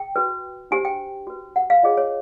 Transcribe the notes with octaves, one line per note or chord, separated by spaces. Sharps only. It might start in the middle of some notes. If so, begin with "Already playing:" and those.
Already playing: G5
F#4 B4
D4 G4 C5 G#5
G5
F#4 B4
F#5
F5
F4 G#4 C#5 D#5
C#5